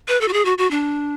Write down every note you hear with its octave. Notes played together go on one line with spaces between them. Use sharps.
B4
A4
F#4
G#4
F#4
F#4
D4